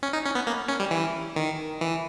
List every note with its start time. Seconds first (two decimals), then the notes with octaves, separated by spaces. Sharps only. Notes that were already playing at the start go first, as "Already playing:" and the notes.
0.03 C#4
0.13 D#4
0.25 C#4
0.35 B3
0.47 A#3
0.69 C#4
0.80 G3
0.91 E3
1.36 D#3
1.81 E3